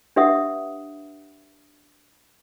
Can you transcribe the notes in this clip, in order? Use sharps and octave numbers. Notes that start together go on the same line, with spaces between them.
D4 G4 B4 E5 F#5 D#6